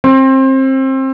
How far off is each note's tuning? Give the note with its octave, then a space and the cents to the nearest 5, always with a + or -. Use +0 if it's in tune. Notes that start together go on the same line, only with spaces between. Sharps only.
C4 +25